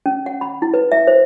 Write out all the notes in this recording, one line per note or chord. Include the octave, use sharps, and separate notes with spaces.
C#4
F#5
B5
E4
B4
E5
C5